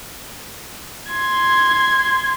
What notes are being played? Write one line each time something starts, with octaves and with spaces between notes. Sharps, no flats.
C6 G#6